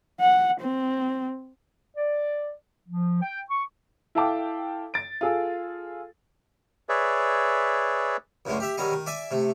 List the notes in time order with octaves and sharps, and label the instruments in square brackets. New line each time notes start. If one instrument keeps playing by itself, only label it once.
[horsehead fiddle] F#5
C4
[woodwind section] D5
F3
G5
C#6
[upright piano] E4 A4 F5 G5 A5 D6
A6 D7
F4 G#4 A4
[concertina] G#4 B4 C#5 D5 E5
[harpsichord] C#2 F#2 A2 D3 G#3
G4 E5
D#3 F#3 G3 G#4 D#5
D#3
D5 E5 G#5
C3 A3